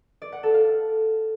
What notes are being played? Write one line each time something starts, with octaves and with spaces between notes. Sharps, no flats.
D5
F#5
A4
F5